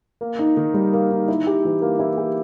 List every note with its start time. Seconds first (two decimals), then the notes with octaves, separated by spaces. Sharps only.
0.21 A#3
0.39 D#4
0.57 D#3
0.74 G3
0.93 A#3
1.11 D#4
1.28 E4
1.47 G4
1.65 E3
1.82 A#3
1.99 E4
2.18 G4